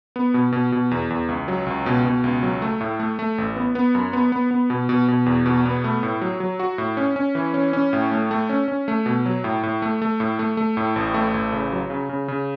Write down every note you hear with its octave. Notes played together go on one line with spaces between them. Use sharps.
B3
B2
B2
B2
E2
E2
C#2
F#3
C#2
B2
B2
C#2
F#3
A3
A2
A3
A3
A1
B3
B3
F#2
B3
B3
B3
B2
B2
B2
E2
B2
B3
A3
A2
F#3
F#3
F#4
A2
C#4
C#4
E3
C#4
C#4
A2
A3
A3
C#4
C#4
A3
B2
F#3
A2
A2
A3
A3
A2
A3
A3
A2
A1
A3
A1
C#3
F#3
C#3
C#3
C#3